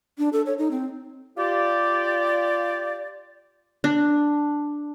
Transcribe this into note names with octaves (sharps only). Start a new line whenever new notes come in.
D4
A4
C#5
D#4
C4
F4 G4 D5
D4